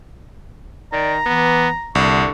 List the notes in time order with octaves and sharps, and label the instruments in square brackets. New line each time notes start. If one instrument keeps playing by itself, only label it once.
[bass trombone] D#3 [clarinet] D5 [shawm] A#5
[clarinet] E3 [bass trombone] B3
[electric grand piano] C2 [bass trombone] D3 [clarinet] C#6